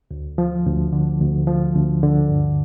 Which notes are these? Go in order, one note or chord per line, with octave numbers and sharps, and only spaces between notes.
D2
F3
D2
D3
D2
F3
D2
D3
G2